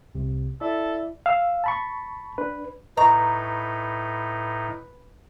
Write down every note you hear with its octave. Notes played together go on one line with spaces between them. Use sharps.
C2 C3
E4 A4 D5 E5
F5 E6
A5 B5 C#6
D4 B4
A2 D#4 B4 D#5 A#5 C#6